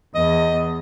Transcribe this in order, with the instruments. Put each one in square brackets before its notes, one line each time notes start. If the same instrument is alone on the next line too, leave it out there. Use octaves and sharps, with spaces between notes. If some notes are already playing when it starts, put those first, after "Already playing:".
[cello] E2 [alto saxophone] D#5